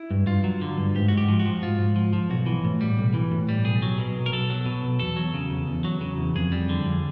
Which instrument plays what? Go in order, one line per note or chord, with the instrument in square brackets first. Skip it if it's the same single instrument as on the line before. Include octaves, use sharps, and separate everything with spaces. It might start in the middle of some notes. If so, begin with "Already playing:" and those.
Already playing: [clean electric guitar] E4
G2
G2 F4
F#3
D3
G2
G#2 G4
G#2 F#4
G4
F3
F#4
F3
G#2 F4
G#2
F3
F3
B1 F#4
E3
A2
G3
B1
E3
A2
G3
B1 G#4
F#3
B2
B1
A#4
B1 A4
F#3
B2
B1
E2 A4
F#3
C#3
E2
E2
F#3
C#3
E2
F2 G#4
G3
D3
F2